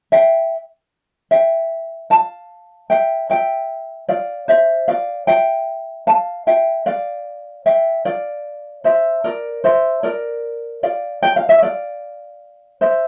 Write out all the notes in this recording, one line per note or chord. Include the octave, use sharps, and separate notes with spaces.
E5 G5
E5 G5
F5 A5
E5 G5
E5 G5
D5 F5
C5 E5
D5 F5
E5 G5
F5 A5
E5 G5
D5 F5
E5 G5
D5 F5
C5 E5
A#4 D5
C5 E5
A#4 D5
D5 F5
G5
F5
E5
D5 F5
C5 E5